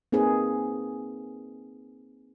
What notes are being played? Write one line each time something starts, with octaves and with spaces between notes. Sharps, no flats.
A#3 C4 D#4 G#4 B4